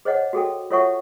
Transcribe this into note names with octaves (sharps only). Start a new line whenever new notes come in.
G#4 C5 C#5 D#5 F#5
F#4 G#4 A4 G5
F4 A4 C#5 E5 F#5 C#6